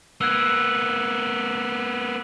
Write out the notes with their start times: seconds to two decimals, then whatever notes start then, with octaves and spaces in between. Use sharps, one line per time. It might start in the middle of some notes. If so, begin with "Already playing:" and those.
0.21 A#3 B3 E6 F#6 G#6